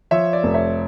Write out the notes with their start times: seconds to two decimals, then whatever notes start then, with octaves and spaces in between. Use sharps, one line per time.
0.11 F3 C#5 E5
0.33 D5
0.43 F1
0.54 C#5 E5